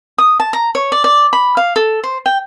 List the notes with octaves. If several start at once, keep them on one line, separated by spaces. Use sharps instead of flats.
D#6
A5
A#5
C#5
D5
D5
B5
F5
A4
C5
G5